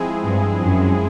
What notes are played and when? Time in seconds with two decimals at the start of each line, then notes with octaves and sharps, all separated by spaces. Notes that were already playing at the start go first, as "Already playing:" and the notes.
Already playing: F3 G#3 C4 E4 G#4
0.26 G2
0.64 F#2